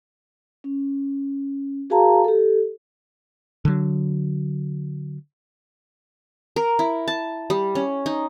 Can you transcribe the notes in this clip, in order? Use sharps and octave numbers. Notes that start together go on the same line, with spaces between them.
C#4
F#4 G#4 A#4 F5 A5 A#5
G4 A4
D3 F#3
A#4
E4
A5
G3
C#4
D#4